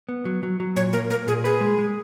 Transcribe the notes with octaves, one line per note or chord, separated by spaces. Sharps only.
B3
F#3
F#3
F#3
A#2 C#5
A#3 A#4
A#3 A#4
A#2 G#4
G#4 B4
G#3
G#3